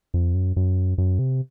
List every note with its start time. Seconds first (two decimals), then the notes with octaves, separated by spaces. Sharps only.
0.14 F2
0.34 F#2
0.56 F#2
0.98 F#2
1.19 C3